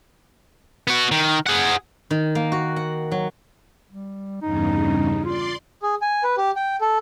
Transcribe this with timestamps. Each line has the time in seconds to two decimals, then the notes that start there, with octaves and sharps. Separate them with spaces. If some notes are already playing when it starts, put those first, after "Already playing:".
0.87 B3 F#4
1.11 D#3
1.46 G#4 F#5
2.11 D#3
2.35 A#3
2.52 F#4
2.76 F#5
3.11 F#3
3.90 G3
4.42 E2 G2 C#3 D#4
5.25 F4 D5 C6
5.83 G#4
6.02 G#5
6.23 B4
6.37 G4
6.56 G5
6.81 A4